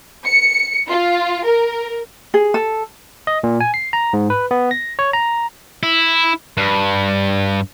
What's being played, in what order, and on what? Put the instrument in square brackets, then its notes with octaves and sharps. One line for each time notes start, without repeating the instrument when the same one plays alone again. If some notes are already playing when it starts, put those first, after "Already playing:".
[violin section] C#7
F4
A#4
[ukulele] G#4
A4
[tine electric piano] D#5
A#2
G#5
C7
A#5
G#2
B4
B3
A#6
C#5
A#5
[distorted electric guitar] E4
G2